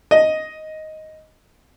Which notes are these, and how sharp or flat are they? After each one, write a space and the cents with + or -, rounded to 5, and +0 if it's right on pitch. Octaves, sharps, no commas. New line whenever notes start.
D#5 +5